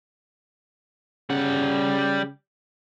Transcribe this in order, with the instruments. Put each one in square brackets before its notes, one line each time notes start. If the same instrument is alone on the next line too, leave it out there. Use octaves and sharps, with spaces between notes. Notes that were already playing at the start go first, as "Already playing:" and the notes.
[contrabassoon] C#3 [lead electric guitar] G3 F#5